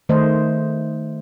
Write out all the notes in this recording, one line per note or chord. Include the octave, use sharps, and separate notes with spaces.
D#3 A3 C5 D#5